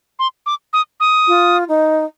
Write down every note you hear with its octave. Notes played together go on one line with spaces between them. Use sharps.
C6
D6
D#6
D#6
F4
D#4